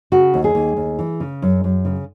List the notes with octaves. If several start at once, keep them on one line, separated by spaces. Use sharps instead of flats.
C#3 F#4
D#2
G#4
D#2
D#2
E3
C#3
F#2
F#2
C#3